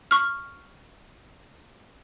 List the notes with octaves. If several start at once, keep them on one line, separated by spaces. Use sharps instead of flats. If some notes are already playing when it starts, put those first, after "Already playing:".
C#6 F6